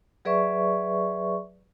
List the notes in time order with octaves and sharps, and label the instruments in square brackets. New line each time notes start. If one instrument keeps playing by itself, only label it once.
[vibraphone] F#3 G#4 B4 D5 E5 C#6